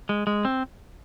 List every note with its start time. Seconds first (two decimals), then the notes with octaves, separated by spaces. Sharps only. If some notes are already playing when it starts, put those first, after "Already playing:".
0.09 G#3
0.27 G#3
0.45 C4